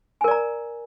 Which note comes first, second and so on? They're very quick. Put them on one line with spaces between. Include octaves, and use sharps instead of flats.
G#5 A#4 D5 A#5